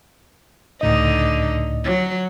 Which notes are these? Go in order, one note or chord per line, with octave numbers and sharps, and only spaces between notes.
C#2 A2 D3 D#4 D#5
F#3